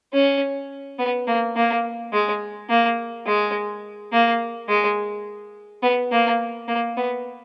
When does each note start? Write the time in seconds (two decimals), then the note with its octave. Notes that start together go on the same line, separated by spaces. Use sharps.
0.13 C#4
0.99 B3
1.27 A#3
1.56 A#3
2.13 G#3
2.69 A#3
3.26 G#3
4.12 A#3
4.69 G#3
5.82 B3
6.11 A#3
6.68 A#3
6.97 B3